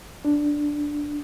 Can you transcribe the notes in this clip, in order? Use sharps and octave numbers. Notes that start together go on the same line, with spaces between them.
D4